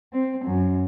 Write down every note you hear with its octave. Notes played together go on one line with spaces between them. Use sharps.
C4
F#2